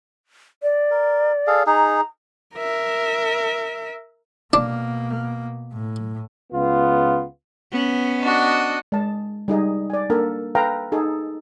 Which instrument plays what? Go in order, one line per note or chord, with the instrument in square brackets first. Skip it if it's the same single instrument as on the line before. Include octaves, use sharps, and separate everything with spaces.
[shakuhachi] D5
[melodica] A#4
G#4 A4 F5
[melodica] D#4 G#4 [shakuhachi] A#5
[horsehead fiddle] A#4 E5
[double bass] B2 A#3 [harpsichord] D4
[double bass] A2
[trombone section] C#2 B3 F4
[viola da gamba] B3 C#4
[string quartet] D4 F#4 D#5
[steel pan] G#3 A5
G3 D#4 G#4 D#5
D5 G#5
A#3 D4 A4 A#4
A4 B4 E5 F5 G5 A#5
D#4 G#4 A4